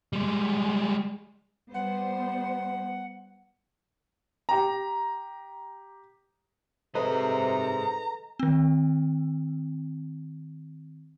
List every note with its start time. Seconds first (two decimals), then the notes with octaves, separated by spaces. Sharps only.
0.13 G3 G#3
1.74 G3 B3 C5 F#5
4.49 G4 A#5
6.95 C3 G#4 A4 B4 C5 D#5 A#5
8.39 D#3 C4